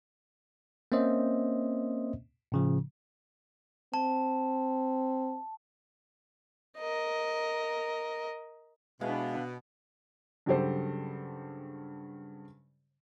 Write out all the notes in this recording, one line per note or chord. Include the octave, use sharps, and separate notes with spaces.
A#3 C4 C#4 C5 D#5 E5
A2 C#3 F3
C4 A5
A#4 D#5
B2 G#3 B3 D4 E4 G#4 F5
G2 C#3 F#3 G4 A4 C5